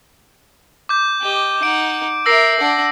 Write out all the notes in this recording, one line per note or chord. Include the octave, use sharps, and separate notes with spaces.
D6 G6
G4 D#5
D#4 F#5 D7
A#4 E5 E6 A#6 C7
D4 F#5